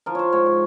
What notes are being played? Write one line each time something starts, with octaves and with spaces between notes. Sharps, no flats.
F3 A#4
C5 C#5
G#2 C#5
C#5